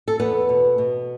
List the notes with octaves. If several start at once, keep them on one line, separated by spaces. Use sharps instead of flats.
A4
E2 B3 B4
B2
B2